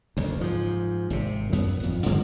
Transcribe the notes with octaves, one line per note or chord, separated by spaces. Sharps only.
F#1 D2
G#2 F3
G#1 C3
F#2 B3
G#1 F2
G2 D3 F3 A#3